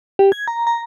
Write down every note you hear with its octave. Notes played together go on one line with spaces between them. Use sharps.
G4
G#6
A#5
A#5